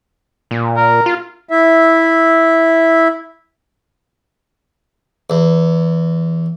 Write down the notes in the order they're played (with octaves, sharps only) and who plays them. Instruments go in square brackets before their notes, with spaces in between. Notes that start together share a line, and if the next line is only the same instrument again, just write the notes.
[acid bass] A#2
[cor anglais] A#4
[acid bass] F4
[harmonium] E4 E5
[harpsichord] E2